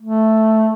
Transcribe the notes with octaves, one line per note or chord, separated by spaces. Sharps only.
A3